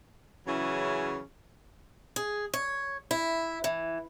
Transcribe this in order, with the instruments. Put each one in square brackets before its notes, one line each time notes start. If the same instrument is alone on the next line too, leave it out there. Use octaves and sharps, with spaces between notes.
[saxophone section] C#3 E3 F#3 C#4 E4 G#4
[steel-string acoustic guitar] G#4
C#5
E4
E3